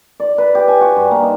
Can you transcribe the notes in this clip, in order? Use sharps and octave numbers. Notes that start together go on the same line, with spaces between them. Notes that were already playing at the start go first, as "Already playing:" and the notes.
D5
B4
G4
G#5
F#4
G2
A#3
D#4